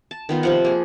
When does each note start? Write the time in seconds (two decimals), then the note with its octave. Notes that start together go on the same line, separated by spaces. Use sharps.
0.11 A5
0.29 D#3 B3 F4
0.43 C3 F3 F#5
0.65 A#3 G#4